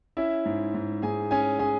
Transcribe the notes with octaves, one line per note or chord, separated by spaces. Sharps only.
C#4 E4 E5
G#2
G#2
G#2 G#4 G#5
C#4 G#4 G#5
C#4 G#4 G#5